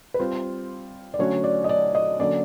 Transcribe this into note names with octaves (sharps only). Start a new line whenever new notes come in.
B4
G3 C4 F4 C5
D5
D3 F#3 A3 C#4 F#4 C#5
D5
D#5
D5
D#5
D3 F#3 A#3 C#4 D5